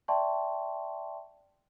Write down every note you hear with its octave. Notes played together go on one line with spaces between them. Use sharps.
D5 E5 G5 A5 C6 C#6